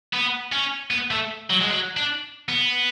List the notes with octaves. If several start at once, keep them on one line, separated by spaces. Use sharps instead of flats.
B3
C#4
B3
A3
F#3
G#3
F#3
D4
B3